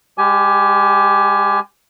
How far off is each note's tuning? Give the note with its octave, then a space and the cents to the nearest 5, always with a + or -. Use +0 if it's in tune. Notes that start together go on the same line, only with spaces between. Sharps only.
G#3 -40 G4 +0 G#5 +20